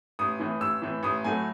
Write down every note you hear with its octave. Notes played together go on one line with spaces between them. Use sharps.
A1 D#6
A2 E3
A1 E6
A2 E3
A1 D#6
A2 F#3 A3 G#5